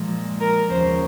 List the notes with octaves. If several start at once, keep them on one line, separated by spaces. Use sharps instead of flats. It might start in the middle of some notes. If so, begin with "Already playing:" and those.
Already playing: A#2 F3 G#3
A#4
D#2 C#3 F3 C5